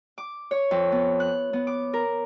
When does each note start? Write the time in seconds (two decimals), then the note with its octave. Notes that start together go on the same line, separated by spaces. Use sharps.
0.18 D6
0.51 C#5
0.71 F2
0.92 B3
1.20 F#6
1.53 B3
1.67 D6
1.93 A#4